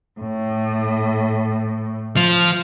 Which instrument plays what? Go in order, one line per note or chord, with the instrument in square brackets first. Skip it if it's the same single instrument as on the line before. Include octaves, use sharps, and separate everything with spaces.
[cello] A2
[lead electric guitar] F3